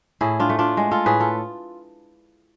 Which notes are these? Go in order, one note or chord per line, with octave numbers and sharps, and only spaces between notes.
A2 E4 G#4
D4 F4
A3
D4 F4
G#3
F4 A4
A2 G#4 B4
F4 A4